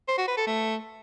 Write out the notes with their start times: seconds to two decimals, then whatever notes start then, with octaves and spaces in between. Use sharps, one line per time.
0.08 C5
0.18 F#4
0.27 B4
0.37 A4
0.47 A3